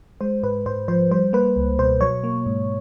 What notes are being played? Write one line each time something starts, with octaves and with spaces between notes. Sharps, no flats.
G#3 C5
G#2 B4
G#2 C5
F3 C5
G3 C5
A#3 B4
C#2
B2 C5
F#3 C#5
A#3
G#2